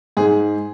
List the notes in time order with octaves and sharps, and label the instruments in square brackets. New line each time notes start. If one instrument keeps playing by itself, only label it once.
[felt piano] G#2 [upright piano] G#4